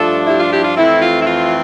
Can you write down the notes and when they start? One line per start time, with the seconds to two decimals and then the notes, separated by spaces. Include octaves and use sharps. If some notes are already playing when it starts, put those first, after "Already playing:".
Already playing: G2 F3 A3 D4 F4 A4
0.27 E4 G4
0.40 F4
0.52 E4 G4
0.64 F4
0.77 F2 E3 A3 C4 E4
1.01 F4
1.22 E4
1.27 F4